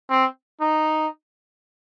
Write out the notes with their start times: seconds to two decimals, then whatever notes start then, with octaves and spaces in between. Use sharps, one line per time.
0.10 C4
0.61 D#4